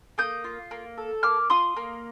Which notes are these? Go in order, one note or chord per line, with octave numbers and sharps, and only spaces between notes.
A#3 D#6 G6
F4
A#3
A4
A#3 D6 F6
F4 C6 D#6
A#3